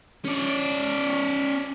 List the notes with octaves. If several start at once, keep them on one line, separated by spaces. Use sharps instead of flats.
C#4 D5